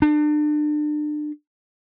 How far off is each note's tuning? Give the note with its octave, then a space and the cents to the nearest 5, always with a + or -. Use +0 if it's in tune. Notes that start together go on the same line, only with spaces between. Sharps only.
D4 +35